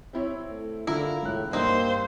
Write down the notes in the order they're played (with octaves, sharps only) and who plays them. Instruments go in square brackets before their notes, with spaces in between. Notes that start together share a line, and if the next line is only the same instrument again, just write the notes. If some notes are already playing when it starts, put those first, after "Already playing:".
[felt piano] C4 E4 C#5
[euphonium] A3
[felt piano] D3 [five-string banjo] E4 A#4 [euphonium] F4
[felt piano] E1 F#6 [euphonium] A2
[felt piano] G2 [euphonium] A#3 [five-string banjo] C4 D#4 [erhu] C5